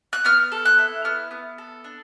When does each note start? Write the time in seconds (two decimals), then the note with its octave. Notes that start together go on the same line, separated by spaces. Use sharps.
0.13 F#6
0.25 B3 F6
0.52 A4
0.65 F#6
0.78 E4
1.05 B3 F6
1.31 B3
1.58 A4
1.84 D4